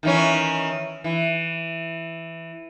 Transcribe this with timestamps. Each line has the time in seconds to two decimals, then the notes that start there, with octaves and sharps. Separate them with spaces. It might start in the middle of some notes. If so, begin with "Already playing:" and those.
0.03 D#3 E3 C#4
1.04 E3